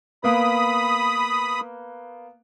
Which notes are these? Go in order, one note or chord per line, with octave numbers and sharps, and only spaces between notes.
A#3 B3 B5 D#6